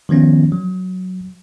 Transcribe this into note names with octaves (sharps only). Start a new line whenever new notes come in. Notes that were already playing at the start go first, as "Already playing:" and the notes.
D#3 F3 B3 C#4
F#3